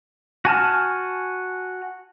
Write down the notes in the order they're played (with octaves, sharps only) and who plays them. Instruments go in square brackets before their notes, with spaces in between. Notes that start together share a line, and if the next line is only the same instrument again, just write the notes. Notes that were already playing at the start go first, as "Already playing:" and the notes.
[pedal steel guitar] F#4 G#5 A5 F6